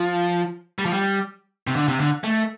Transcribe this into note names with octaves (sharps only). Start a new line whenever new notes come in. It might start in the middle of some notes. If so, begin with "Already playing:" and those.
Already playing: F3
G3
F3
G3
C3
D3
C3
D3
A3